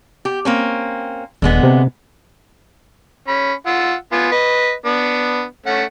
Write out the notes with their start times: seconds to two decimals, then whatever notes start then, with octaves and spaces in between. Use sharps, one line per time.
0.25 G4
0.45 A#3 C4 C#4
1.42 D#1 D3 G#3 B3
1.63 C3
3.28 C#4 B5
3.67 F4 F#5 E6
4.12 B3 F4 G#5
4.32 B4 D#5
4.86 B3 D4
5.66 A3 C#4 F#5